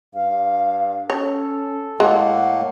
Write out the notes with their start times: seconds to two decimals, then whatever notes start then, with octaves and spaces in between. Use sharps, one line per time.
0.14 G2 F5
1.10 C#4 A4 C#5
2.00 A2 G#3 A#3 F#5